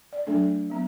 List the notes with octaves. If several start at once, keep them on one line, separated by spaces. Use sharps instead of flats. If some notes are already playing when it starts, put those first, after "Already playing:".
D5
F#3 A3 D4 A4
F#3 B3